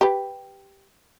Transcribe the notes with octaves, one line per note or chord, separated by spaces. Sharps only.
G4 B4